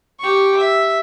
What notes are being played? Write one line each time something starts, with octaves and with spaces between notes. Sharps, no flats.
G4 C#6
E5